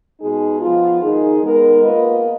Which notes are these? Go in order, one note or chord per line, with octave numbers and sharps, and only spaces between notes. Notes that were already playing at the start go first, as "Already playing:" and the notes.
B2 G#3 D#4 G#4
F3 B3 F4
D#3 G#3 D#4 G#4
G#3 B3 D#4 A#4
A#3 F4 B4 D#5